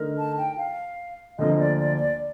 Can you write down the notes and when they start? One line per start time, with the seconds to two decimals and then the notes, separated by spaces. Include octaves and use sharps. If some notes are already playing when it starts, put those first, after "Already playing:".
Already playing: D3 A3 D#4 A#4
0.18 A5
0.38 G5
0.58 F5
1.38 D2 D3 F3 A#3 D#5
1.59 D5
1.78 D5
1.99 D5